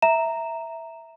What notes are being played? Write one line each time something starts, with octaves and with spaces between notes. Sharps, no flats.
E5 A#5 E7